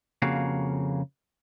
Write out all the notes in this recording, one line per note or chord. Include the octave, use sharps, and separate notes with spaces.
F2 C#3 A#3 F#4 G#4 F5